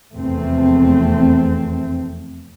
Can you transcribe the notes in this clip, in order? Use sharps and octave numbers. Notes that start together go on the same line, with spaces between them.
F1 E2 A3 C4